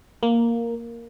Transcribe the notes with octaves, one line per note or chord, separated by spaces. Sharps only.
A#3